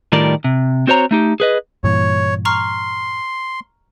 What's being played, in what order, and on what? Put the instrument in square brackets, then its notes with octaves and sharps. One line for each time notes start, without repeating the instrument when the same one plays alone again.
[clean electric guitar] A2 D#3 G3 F4 A#4 D5
C3
C4 F#4 C5 C#5 A#5
A3 D#4 G4
G#4 B4 D#5
[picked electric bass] G2 A#2 E3 [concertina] C#5
[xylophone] A#5 C#6 F6 [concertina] C6